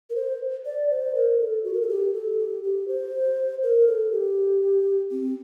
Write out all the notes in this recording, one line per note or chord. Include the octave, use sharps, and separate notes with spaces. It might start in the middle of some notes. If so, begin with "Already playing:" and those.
A#4
C5
D5
C5
A#4
A4
F#4
A#4
A4
G4
A4
G4
G4
C5
A#4
A4
G4
C4